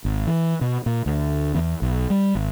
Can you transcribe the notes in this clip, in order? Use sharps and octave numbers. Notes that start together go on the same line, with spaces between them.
G#1
E3
B2
A#2
D2
E2
B1
G3
G#1